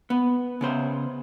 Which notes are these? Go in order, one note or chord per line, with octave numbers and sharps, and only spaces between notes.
B3
C#3 B3 C5